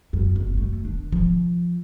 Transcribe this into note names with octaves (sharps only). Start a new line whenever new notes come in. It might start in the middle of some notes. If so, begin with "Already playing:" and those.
F#2
F#1 C3
F#2 A3
D#3 D4
F3